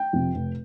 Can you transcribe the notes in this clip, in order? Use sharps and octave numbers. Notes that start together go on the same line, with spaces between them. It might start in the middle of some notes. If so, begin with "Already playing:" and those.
Already playing: G5
F2 C3
F1